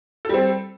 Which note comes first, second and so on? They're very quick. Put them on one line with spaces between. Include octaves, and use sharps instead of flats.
A4 G3 C4